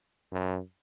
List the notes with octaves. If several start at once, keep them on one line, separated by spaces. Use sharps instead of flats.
F#2